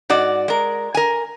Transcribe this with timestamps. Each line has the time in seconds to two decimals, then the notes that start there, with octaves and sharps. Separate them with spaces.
0.10 G#2 F#4 D5
0.48 G#3 A#4
0.95 A#4 G#5